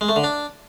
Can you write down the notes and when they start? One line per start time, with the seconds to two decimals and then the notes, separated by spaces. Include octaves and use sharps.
0.01 G#3
0.09 A3
0.16 D3
0.24 D4